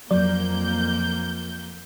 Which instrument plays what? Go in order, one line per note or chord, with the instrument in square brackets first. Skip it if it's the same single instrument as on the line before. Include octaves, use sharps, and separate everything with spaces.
[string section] F2 A#3 G6 [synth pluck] F#3 D5